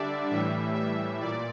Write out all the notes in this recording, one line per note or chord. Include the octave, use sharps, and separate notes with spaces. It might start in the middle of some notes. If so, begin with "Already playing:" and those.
Already playing: D3 G3 D4 D5 E5
A2 E3 G3 E5
E5
A#2 D5